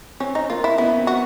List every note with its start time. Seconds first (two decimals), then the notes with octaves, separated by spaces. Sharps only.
0.20 C4 C#4
0.35 D#4
0.50 A#3 F4
0.64 E4
0.78 B3 E4
0.98 C4
1.07 F#4